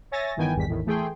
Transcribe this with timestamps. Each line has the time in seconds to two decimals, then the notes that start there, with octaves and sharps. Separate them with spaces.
0.11 C#5 E5 G#5 A6 A#6
0.36 G1 D#3 E3 B3 G5 G#5
0.55 G#1 E2 G2 D#3 B6
0.68 A1 E2 A2 D#3
0.86 E3 A3 G#4 G5 C6